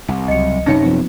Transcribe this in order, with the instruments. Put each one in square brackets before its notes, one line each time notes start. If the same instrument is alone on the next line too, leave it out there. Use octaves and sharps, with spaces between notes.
[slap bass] C2
[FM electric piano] C#2 F#3 [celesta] D#5 C#7
[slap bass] F#2 C3 C#4 [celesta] D#4 C#5 [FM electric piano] A#6 C#7
[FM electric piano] F3 B3 C4